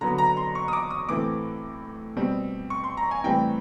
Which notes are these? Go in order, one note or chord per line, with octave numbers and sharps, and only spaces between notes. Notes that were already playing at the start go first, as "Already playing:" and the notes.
D3 F#3 B3 A#5
A#5
C6
C#6
D#6
D6
D#6
A2 E3 A3 C4 D6
B2 G3 C4
C#6
C6
A#5
G#5
A2 E3 G3 C4 G5